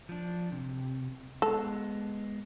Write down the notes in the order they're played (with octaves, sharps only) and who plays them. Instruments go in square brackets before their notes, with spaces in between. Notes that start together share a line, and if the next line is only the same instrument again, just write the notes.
[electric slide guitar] F3 D4
C3
[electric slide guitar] G#3 B3 [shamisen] A4